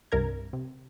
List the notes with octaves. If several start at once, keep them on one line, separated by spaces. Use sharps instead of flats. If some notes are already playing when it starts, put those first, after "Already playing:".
C2 G2 C3 A#4 A#5 G#6
C3